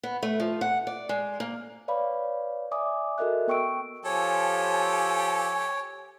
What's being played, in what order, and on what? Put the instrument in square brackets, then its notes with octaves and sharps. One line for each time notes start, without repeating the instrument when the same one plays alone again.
[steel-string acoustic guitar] B3
A3
F3
F#5
D5
G#3
A#3
[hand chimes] B4 C#5 D5 F5 B5
D5 E5 G#5 D6 D#6
F#4 A4 A#4 D#5 E5 F#6
B3 G5 C#6 E6 D7
[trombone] F3 [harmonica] G4 A4 [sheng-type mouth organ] C#5 [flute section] G#5